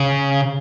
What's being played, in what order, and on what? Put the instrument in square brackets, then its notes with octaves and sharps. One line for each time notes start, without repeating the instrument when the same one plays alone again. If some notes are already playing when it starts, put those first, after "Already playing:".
Already playing: [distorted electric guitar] C#3